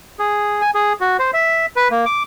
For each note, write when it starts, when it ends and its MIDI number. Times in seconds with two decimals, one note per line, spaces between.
0.19 0.61 68
0.61 0.71 80
0.75 0.93 68
1.01 1.17 66
1.19 1.31 72
1.33 1.66 76
1.76 1.88 71
1.91 2.05 58
2.05 2.23 86